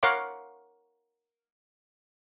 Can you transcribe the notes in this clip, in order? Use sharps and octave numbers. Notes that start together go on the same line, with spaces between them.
A#4 C#5 F5 F#5 C6 D6